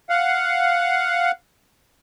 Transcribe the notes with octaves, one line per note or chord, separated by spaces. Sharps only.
F5 F#5